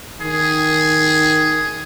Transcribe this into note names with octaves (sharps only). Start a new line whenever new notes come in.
D#3 G#4